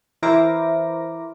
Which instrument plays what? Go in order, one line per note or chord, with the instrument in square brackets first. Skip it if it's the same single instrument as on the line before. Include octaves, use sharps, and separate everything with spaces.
[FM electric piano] E3 E4 A#4 C5 D6 A#6